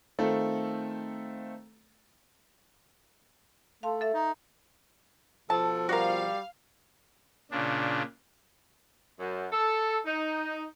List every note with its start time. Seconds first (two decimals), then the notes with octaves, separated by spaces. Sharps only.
0.19 D#3 A3 C4 F4 A4
3.83 A3 F5 A5 C6
4.01 A4 E5
4.14 D#4
5.50 B2 F3 A4 A5
5.89 G3 F#4 A#4 F5
7.51 A#2 C#3 D4
9.19 F#2
9.52 A4
10.05 D#4